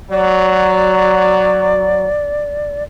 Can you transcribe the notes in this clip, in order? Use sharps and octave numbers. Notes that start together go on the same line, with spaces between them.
F#3 D5